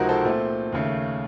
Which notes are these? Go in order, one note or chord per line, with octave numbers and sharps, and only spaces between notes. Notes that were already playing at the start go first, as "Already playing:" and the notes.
Already playing: C#2 C3 F3 C4 D#4 F#4 A#4
A4 C5
A#2 A3 C4
D#2 C#3 A3